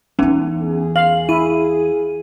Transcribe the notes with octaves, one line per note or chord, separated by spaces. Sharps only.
E2 E3 B3 C#4 D#4
G#4
F5 F#7
E4 D#7